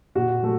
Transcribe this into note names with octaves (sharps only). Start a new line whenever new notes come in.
A#2 F#4
F#3 A3